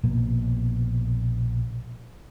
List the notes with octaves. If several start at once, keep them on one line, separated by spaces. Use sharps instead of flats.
A#1 B2 A#3